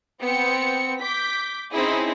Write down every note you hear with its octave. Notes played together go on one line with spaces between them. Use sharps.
B3 C4 G5 C#7
D6 G6 B6
C4 C#4 D#4 E4 G#4